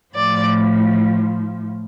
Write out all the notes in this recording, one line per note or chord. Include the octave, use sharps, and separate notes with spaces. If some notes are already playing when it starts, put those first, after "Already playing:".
A2 F3 D5